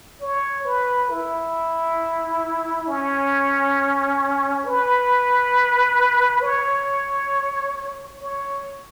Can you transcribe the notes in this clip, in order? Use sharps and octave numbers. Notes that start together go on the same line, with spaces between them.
C#5
B4
E4
C#4
B4
C#5
C#5